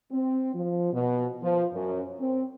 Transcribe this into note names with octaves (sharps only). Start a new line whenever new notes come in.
C4
F3
B2
F3
F#2
C4